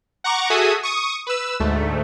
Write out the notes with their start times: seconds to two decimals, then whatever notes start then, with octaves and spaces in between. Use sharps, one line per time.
0.24 F#5 A#5 C#6 D6
0.50 F#4 G#4 A4 E5 G#5 D#6
0.83 C#6 D#6
1.27 B4 E6
1.60 D2 G#2 A3